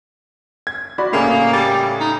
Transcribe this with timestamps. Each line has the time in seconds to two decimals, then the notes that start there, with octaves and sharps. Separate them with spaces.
0.67 G#6
0.98 F#4 D5 B5
1.13 A2 C#3 A#3 G#4
1.53 G3
2.00 D#4